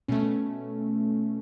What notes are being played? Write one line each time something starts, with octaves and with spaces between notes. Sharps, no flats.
B2 A3 C#4